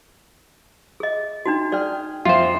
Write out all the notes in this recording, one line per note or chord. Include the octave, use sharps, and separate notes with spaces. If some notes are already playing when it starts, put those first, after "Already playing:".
G#4 D#5
D4 D#4 F#4
G#4 D5 G5 F6
F2 F4 C5 E5